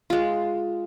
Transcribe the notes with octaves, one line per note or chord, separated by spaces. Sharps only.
G#3 F4